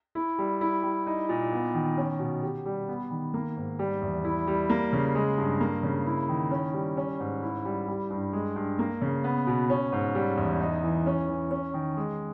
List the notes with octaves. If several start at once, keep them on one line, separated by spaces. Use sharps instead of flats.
E4
G3
E4
G3
D#4
A#2
B3
D#3
C#4
B2
G4
G3
B3
D#3
A#3
G#2
G3
E2
E4
G3
A#3
C#3
G#3
G2
A#3
C#3
E4
D#3
C#4
G3
C#4
G#2
E4
G3
G3
G2
G#3
G2
A#3
C#3
B3
B2
C#4
G#2
G3
E2
D#4
E3
C#4
E3
C#4
D#3
G#3